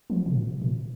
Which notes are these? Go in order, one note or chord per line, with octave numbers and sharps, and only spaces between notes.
F3
C3
A#2
A#2